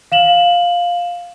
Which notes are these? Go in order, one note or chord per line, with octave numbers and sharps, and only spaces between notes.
F5 E7 F#7